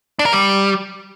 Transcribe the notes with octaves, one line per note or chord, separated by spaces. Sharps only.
D4
A#4
G3